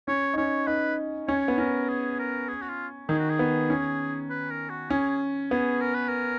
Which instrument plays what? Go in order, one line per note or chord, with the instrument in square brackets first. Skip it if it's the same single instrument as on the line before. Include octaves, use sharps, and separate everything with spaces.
[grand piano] C#4 [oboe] C#5
[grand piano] D#4
[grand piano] C#4 [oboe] C#5
[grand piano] D#4 [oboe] B4
[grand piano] C#4 [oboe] C#5
[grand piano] B3
[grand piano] C#4 [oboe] A#4
[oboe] G#4
A#4
G#4
F#4
F4
[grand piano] D#3 [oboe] G#4
[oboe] F#4
G#4
[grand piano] B3
C#4
[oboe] B4
A#4
F#4
[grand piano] C#4 [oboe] G#4
[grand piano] B3 [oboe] G#4
[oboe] A#4
B4
A#4